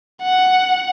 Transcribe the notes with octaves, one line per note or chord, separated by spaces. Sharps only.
F#5